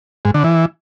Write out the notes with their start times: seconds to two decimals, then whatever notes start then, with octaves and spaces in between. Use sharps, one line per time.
0.25 G#2
0.34 D3
0.44 E3